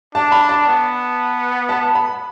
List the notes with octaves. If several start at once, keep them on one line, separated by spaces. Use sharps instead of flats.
D4 A5
B5
A5
B3
A5
B5